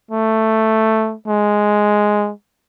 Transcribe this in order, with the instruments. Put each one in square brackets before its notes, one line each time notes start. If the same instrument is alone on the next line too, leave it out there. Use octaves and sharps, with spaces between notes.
[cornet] A3
G#3